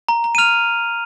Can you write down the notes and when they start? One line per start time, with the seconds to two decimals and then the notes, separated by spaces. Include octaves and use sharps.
0.09 A#5
0.24 A#5
0.35 D#7
0.38 F6 F7